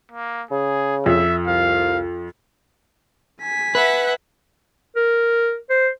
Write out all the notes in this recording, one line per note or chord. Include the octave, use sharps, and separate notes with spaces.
A#3
C#3 G#4
F2 E5
C2 F5
G#5 B6
B4 E5 F#5
A#4
C5